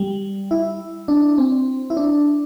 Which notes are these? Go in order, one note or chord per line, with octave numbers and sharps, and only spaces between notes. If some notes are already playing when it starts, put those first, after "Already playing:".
Already playing: G3
E4
D4
C4
E4
D4